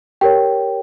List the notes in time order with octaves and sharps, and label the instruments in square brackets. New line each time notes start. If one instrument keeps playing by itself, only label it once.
[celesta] G4 A#4 C#5 G5